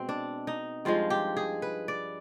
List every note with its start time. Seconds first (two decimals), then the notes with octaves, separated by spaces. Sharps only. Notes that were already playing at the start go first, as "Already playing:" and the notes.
Already playing: B2 G#3 C4
0.09 D4
0.47 D#4
0.85 G2 F3 G#3 F4
1.10 G4
1.37 G#4
1.62 B4
1.88 D5